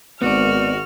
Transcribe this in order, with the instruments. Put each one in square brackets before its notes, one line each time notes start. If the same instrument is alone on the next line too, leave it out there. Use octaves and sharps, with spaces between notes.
[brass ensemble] G#1 [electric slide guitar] B3 D5 [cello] F#4 [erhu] F6